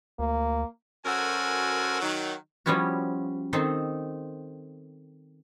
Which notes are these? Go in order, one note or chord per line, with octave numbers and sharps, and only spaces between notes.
D2 A#3
F#2 F#4 A4 A#4 C5 G#5
D#3 F#3
F3 G3 B3 C#4 E4 F#4
D#3 C4 D#4 A4 C5